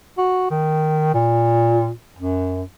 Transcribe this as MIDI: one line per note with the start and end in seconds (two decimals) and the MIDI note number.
0.18 0.46 66
0.50 1.10 51
1.14 1.91 46
2.18 2.63 42